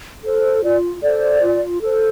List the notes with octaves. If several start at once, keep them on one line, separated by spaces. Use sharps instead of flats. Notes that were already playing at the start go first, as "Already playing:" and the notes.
A4 C5
F4 D5
A4 C5 D5
F4
A4 C5